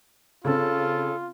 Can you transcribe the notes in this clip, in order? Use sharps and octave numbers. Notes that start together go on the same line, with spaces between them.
C#3 C4 F4 A4